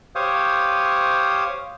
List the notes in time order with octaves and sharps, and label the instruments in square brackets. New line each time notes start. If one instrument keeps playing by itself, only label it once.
[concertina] G4 C5 C#5 F5 D#6